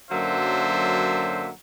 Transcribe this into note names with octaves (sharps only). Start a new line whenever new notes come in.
F#2 D3 F#3 A#3 C5 E5